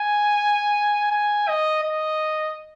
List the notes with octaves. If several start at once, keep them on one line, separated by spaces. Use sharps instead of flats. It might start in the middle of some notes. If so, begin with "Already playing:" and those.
Already playing: G#5
G#5
D#5
D#5